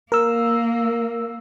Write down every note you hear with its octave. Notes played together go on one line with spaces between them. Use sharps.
A#3 A#4 E6